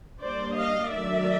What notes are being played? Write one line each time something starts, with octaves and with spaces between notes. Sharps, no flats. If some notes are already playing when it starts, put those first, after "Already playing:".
G3 A#3 D4 C5 D5
D#5 F5
D#3 F#3 A3 D4 D5 E5